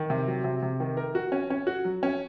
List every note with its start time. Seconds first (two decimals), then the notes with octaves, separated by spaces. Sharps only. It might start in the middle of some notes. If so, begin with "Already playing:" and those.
Already playing: D#3
0.10 C3
0.27 F#3
0.44 C3
0.62 C3
0.80 D#3
0.97 A#4
1.15 F#4
1.32 C#4
1.50 C#4
1.67 F#4
1.85 F#3
2.03 C#4